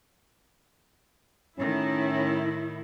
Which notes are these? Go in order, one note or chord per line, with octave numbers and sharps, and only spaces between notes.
A2 D#3 C#4 E4